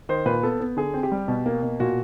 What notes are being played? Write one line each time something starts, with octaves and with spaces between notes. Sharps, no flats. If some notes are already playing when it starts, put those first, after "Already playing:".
D#3 C5
A#2 B4
B3 A4
B3
D3 G#4
C4
G4
G3
B2
A#3
B2
A#2 F#4